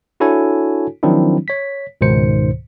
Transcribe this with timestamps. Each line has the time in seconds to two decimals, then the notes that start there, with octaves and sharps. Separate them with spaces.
0.20 D4 E4 F#4 A4 C#5 G#5
1.03 D#3 F3 F#3 C4 D4 E4
1.48 C#5 B6
2.01 C#2 G#2 B2 D#3 C5 C#7